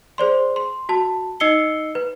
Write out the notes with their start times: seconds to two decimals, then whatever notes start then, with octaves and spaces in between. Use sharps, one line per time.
0.18 G#4 C5 D5 C6
0.56 C6
0.89 F#4 A5
1.40 D#4 D#5 E6 C7 C#7 G7
1.95 B4